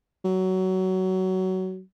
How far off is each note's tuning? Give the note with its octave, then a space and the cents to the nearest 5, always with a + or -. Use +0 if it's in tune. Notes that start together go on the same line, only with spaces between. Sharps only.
F#3 +20